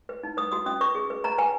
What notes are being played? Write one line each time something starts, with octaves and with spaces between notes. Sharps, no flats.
B4
D#4
B4 D#6
F#4 D#6
C#4 D#6
B4 C#6
G#4
B4
B4 A#5
B4 G#5